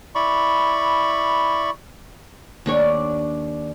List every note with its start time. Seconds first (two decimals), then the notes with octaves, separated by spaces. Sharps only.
0.15 E4 D5 B5 C#6
2.66 D#2 D4 C#5